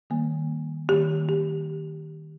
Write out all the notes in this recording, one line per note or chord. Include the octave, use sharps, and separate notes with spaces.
D#3 G3 A#3
D#3 G3 A#3 G4
G4